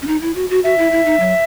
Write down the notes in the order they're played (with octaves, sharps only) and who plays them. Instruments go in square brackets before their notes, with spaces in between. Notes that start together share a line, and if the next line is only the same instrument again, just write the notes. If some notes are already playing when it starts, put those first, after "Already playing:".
[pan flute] C#4
D#4
E4
F#4
F#4
[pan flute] F#4 [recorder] E5
[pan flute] E4
E4
D#4
F#3